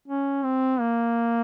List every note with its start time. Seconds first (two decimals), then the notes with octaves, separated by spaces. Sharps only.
0.08 C#4
0.44 C4
0.80 A#3